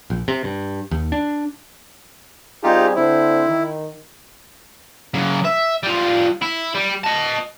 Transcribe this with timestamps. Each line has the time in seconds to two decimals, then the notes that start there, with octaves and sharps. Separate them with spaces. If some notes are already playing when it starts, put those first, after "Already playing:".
0.10 A#1
0.28 C3
0.44 G2
0.91 D#2
1.12 D4
2.64 G3 C4 D#4 F4 G4 G#4
2.95 D3 C4 E4 C5
3.48 D#3
5.14 C#3 F#3
5.45 E5
5.83 G3 F4
6.42 E4
6.75 G3
7.04 D#5 A5